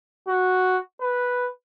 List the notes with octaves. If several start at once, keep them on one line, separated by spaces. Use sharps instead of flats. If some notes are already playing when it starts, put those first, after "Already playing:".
F#4
B4